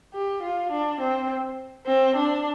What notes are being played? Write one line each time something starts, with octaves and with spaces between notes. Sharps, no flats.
G4
F4
D4
C4
C4
D4